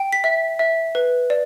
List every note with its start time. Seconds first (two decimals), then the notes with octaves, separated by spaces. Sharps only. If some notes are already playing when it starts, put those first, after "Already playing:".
Already playing: G5
0.13 B6
0.24 E5
0.59 E5
0.95 B4
1.30 D5